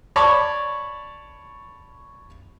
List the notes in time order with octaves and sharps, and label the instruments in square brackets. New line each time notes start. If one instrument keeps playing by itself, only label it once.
[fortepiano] C#5 D5 A5 B5 C#6